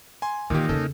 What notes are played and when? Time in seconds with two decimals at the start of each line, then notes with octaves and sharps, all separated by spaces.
0.22 G#5 C6
0.50 A#2 D#3 E3 A#3 D#4 G4
0.69 E2 C#3 C#4 A4